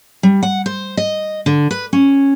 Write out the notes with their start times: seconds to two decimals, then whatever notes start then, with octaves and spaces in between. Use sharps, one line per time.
0.23 G3
0.43 F#5
0.66 C5
0.97 D#5
1.46 D3
1.71 B4
1.93 C#4